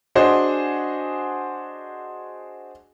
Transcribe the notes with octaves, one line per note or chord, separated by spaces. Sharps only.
D4 F#4 G#4 C5 D#5